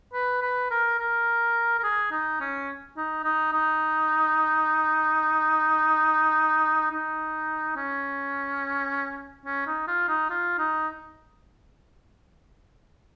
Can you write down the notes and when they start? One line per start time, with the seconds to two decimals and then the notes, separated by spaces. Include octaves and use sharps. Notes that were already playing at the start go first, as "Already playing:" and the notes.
0.13 B4
0.42 B4
0.71 A#4
0.99 A#4
1.79 A#4
1.83 G#4
2.11 D#4
2.40 C#4
2.96 D#4
3.24 D#4
3.52 D#4
6.91 D#4
7.76 C#4
9.45 C#4
9.67 D#4
9.88 F4
10.08 D#4
10.30 F4
10.58 D#4